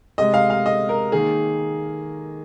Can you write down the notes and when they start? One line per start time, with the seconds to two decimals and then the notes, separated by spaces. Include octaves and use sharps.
0.18 C3 G#3 D#5
0.34 F5
0.50 F5
0.66 D#5
0.89 A#4
1.12 D#3 A#3 G#4